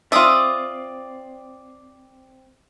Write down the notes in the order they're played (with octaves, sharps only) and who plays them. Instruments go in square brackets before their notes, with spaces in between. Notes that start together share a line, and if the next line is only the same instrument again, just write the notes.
[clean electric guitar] C4 [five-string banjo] F4 E5 [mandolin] D5 D#6